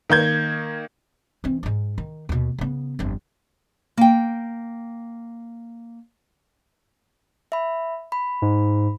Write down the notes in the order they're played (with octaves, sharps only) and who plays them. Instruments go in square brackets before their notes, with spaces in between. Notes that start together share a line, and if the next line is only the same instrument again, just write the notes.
[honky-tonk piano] D#3 A#3 G6 G#6
[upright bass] E3 C4
G#2 D#4
D#3
D#2 B2
C#3 B3
G1 F2
[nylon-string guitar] A#3 G5
[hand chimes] E5 B5
B5
[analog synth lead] G#2